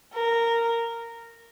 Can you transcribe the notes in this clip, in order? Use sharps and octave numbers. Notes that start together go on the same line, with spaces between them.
A#4